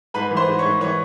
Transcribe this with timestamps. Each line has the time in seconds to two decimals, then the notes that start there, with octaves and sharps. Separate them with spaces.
0.14 G#2 B4 B5
0.31 E3
0.37 C5 C6
0.48 G#2
0.58 C#5 C#6
0.65 G#2
0.81 E3 C#5 C#6